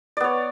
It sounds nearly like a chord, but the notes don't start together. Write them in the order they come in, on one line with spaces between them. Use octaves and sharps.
D5 B3 C#5